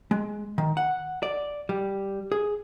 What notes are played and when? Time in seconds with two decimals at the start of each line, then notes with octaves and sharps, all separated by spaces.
0.11 G#3
0.58 D#3
0.77 F#5
1.23 D5
1.69 G3
2.32 G#4